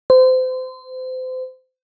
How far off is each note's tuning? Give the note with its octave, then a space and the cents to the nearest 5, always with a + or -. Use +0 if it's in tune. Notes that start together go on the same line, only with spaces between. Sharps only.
C5 -30